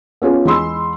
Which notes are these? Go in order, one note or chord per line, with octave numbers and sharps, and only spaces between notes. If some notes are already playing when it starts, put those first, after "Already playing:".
B3 C#4 F4 G#4
E2 G#3 B5 C6 E6